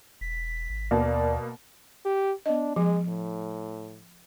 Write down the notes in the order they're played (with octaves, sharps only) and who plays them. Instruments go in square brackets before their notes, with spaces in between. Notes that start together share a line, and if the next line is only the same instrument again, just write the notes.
[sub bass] E1 [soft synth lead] B6
[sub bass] G#1
[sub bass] D#2 [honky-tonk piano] B2 A#3 [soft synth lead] D5
[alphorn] G4
[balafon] B3 D#5 [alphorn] D4
[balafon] F3 [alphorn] G#3
[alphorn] A2